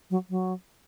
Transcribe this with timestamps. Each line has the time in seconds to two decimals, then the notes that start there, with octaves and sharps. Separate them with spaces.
0.10 F#3
0.30 F#3